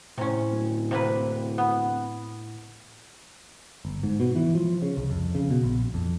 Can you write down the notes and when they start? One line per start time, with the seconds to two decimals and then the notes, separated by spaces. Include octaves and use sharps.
0.18 A2 C3 C#4 E4
0.51 D1
0.91 C3 A#3 B4
1.58 B3
3.85 G1
4.03 G#2
4.20 B2
4.35 E3
4.55 F3
4.82 C#3
4.97 C2
5.10 F2
5.35 C#3
5.50 B2
5.63 A#1
5.94 F2